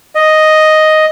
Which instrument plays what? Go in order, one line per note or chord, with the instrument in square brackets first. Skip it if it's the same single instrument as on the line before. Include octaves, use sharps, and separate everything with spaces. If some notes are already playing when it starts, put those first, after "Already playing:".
[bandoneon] D#5